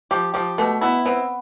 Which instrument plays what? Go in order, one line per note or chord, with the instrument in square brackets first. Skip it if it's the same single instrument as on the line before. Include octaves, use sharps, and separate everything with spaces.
[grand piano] F3 [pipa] G4
[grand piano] F3 [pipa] G4
[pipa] B2 [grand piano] A3
[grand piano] B3 [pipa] E4
[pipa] B3 [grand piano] C4